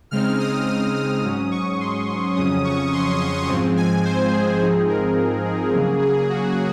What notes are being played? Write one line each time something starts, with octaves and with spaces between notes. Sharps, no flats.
C#3 G#3 C4 D#4 F6
D#6
D#6
D#6
G#2 F#3 C#4
C#6
C6
C6
F2 C#3 F#3 C#4 D#6
C#6
C6
G#2 F3 G#3 C4
G#5
C5
G#4
G#2 F3 C4 D#4
A#4
G#4
C#3 F#3 A#3
G#4
F#4